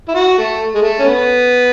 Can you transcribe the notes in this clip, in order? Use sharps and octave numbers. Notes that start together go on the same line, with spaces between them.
E4
F#4
A3
G#3
A3
C#4
B3